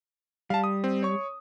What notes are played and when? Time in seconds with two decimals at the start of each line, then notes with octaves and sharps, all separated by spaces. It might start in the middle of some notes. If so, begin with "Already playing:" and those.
0.50 G3 F5 A5
0.64 D#6
0.84 C4
1.03 C#5 C#6